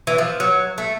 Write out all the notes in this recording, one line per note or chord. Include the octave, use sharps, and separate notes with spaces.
E3
F3
F#3
A3